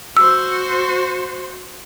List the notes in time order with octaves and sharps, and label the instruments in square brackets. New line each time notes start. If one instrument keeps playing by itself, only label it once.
[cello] F#4 C5 [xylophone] E6